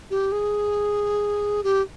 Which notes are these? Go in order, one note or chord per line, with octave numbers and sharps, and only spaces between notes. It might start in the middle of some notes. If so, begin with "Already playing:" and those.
G4
G#4
G4